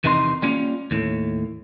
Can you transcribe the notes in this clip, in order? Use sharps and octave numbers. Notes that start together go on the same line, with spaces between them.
E2 C3 D#3 D#4 F4 C6
G3 A#3 C#4 F4
D#2 A2